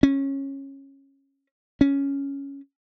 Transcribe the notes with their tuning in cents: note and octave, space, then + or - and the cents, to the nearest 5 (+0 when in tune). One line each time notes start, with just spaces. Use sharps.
C#4 -15
C#4 +5